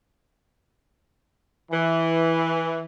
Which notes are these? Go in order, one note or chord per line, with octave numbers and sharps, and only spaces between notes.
E3